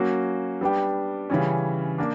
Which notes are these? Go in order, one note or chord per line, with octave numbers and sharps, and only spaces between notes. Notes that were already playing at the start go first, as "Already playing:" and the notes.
Already playing: F#3 A#3 C#4 F#4
G3 B3 D4 G4
C#3 E3 G3 C#4
A#3 D4